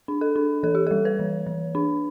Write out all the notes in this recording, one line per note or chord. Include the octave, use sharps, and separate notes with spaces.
D4
A4
D4
E3 A4
G4
G3 A4
B4
E3
E3
D4